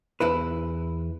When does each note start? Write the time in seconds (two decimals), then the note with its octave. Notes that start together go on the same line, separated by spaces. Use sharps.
0.20 E2 E4 B4